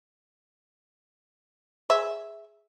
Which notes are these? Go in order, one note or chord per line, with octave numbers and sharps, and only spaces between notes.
G#4 E5